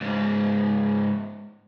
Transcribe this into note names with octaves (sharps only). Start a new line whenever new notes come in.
C#2 G#2